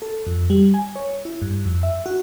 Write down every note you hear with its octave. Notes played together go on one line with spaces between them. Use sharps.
A4
F2
G3
G#5
C#5
E4
G2
F2
E5
F#4